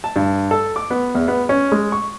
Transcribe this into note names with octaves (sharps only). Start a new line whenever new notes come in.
A5
G2
A4
D6
B3
E2
B3
C#4
G#3
C#6